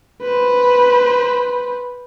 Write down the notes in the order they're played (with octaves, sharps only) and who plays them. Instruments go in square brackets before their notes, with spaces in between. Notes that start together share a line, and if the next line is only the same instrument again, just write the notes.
[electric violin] B4 C5